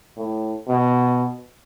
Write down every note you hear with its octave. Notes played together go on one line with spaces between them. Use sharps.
A2
B2